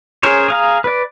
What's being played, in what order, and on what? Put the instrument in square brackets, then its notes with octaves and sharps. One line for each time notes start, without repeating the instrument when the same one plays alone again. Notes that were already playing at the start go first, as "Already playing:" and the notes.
[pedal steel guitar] C#4 G#4 A#4 C5 C#5
G#4 F5 A#5
B4 D5